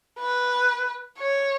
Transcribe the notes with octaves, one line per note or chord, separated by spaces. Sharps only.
B4
C#5